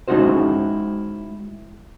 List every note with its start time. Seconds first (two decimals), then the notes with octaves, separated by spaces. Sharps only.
0.08 G#3 C#4 D#4 E4 F#4 C5